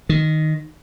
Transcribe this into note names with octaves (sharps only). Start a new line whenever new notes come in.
D#3